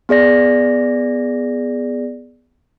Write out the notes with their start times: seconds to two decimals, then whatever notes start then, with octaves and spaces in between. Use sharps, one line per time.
0.09 B3 G#4 D5 A#6